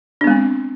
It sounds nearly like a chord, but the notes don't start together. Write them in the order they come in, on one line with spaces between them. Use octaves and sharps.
D4 B3 G#3 C4